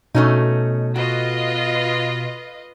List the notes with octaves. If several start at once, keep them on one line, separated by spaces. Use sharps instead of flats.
B2 A3 C#4 D#4
F4 F#4 B4 D#5